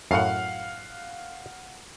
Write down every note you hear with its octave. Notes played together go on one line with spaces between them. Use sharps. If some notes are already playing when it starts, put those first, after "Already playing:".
F#2 A2 F5 F#5